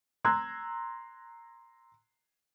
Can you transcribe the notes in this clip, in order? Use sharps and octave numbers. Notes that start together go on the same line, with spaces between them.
A#5 C6 E6 F#6 G#6